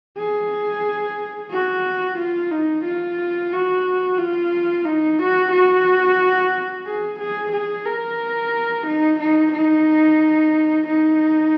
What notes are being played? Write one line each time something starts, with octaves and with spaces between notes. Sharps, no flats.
G#4
F#4
F4
D#4
F4
F#4
F4
D#4
F#4
F#4
G#4
G#4
G#4
A#4
D#4
D#4
D#4
D#4